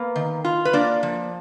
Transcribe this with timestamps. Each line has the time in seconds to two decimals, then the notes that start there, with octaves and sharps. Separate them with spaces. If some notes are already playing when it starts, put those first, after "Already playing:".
Already playing: A#3 B3 B4
0.16 D#3
0.44 F4
0.65 B4
0.73 A#3 D4 D5
1.03 F3